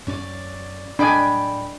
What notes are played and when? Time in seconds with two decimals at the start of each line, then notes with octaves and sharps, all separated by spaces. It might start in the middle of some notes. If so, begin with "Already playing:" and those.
0.07 F#2 C#4 C#5 D5
0.99 D1 D4 D5 D#5 G5 G#5 B5